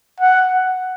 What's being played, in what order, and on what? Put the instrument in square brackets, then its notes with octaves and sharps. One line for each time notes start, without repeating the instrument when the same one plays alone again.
[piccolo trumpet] F#5